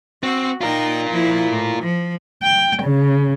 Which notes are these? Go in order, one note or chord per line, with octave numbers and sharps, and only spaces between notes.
C4 F#4
D#4 F4 A#4 G5
F3 E4
A2
F3
G5
C#3